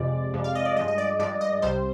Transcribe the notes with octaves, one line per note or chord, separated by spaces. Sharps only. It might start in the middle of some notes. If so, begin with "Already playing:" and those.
Already playing: F2 C3 F3 G#3 D5
F2 C3 F3 G#3
F5
D#5
D5
G2 F3 G#3 D#5
D#5
D5
G2 F3 G#3 D5
D#5
C2 C3 G3 C5